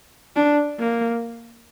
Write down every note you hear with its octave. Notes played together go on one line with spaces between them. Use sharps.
D4
A#3